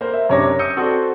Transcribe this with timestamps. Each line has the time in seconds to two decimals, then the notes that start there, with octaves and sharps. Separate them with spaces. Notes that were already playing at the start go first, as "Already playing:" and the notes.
0.01 A#3 C5
0.13 E5
0.29 F#2 C3 D4 C#5 D6 A#6
0.59 D#6 E6 G6 C#7 D#7
0.77 C4 F#4 A4 D5